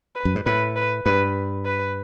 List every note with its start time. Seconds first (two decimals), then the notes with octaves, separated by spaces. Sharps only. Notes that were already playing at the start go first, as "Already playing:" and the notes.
0.15 B4
0.25 F#2
0.35 G#2
0.46 A2 B4
0.76 B4
1.06 G2 B4
1.65 B4